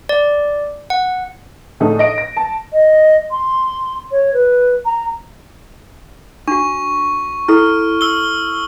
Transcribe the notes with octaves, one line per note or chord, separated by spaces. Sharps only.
D5
F#5
A2 D3 D#4 G#4 A4
D#5 D7
A#6
A5
D#5
C6
C#5
B4
A#5
D4 F#4 C#6
E4 A4 F6
E6 G7